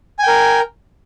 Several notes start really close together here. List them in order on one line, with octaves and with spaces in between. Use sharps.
G#5 G5 A#4